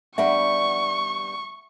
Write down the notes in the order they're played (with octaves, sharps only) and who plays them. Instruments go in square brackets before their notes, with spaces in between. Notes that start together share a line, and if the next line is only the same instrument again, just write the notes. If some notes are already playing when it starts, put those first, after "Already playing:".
[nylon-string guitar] G3 B3 D4 [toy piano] E5 F#5 [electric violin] C#6